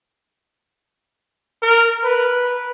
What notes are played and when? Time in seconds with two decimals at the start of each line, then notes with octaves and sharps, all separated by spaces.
1.62 A#4
2.04 B4